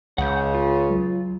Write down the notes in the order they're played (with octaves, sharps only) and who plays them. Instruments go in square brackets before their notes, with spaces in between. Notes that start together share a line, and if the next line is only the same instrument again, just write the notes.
[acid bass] C#2 [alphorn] C#3 [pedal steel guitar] F#5 G6
[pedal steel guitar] F4
[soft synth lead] F#3